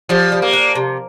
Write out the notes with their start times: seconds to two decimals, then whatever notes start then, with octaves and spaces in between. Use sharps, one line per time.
0.09 F3 G3
0.32 G3
0.42 A#3
0.53 D4
0.75 C3